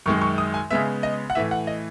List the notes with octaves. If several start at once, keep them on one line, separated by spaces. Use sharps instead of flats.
F#2 D#3 G#3 C#6
C#6
D#6
G#5
C#3 G#3 B3 E5
D#5
F#5
A2 E3 A3 E5
F#5
D#5